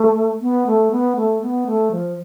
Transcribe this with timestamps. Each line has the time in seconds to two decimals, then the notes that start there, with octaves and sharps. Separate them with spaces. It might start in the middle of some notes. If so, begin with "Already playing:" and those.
Already playing: A3
0.42 B3
0.67 A3
0.91 B3
1.16 A3
1.42 B3
1.67 A3
1.91 F3